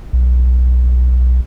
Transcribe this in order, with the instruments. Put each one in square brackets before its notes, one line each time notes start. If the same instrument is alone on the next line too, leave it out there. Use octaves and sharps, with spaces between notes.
[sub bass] B1